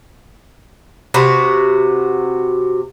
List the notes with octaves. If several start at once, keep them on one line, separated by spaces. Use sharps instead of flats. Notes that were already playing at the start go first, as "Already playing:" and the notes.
C3 F#4 B4